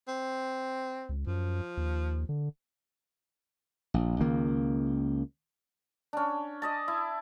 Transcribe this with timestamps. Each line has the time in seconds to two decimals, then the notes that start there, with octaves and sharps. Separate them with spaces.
0.08 C4
1.09 C#2
1.27 F#2 F3
1.77 D#2
2.29 D3
3.94 A#1
4.20 C#2 D#3 A#3
6.13 C#4 D4
6.62 D5 D#5 A5
6.88 E4